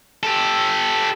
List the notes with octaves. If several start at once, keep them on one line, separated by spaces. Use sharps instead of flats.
G4 A4